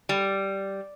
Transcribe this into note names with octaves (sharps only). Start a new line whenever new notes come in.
G3